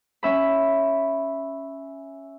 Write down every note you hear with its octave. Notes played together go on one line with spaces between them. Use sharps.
C#4 E5 B5